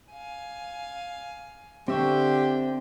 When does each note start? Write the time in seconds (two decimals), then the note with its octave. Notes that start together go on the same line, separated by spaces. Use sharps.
0.13 F5 G#5
1.88 D3 C4 G4 E5 G5 C#6